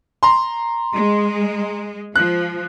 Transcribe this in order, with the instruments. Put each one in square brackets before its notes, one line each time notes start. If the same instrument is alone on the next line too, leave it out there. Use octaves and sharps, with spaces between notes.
[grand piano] A#5 C6
[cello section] G#3
[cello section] F3 [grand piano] F#6